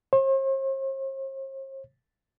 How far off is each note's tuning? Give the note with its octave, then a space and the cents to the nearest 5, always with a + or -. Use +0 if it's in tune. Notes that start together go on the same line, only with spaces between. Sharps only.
C5 +45